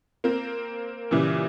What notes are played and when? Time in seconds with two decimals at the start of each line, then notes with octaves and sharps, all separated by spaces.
0.24 A#3 C4
1.11 A#2 C#3 E3 G3